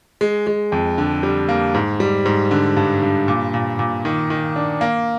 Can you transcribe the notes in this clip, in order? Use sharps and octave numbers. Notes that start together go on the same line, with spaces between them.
G#3
G#3
F2
D3
G3
A#3
G#2
G3
G#2
D3
G2
G2
A#2
A#2
A#2
D#3
D#3
D4
A#3